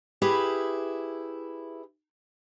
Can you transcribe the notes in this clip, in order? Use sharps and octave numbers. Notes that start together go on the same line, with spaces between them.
E4 G4 G#4 B4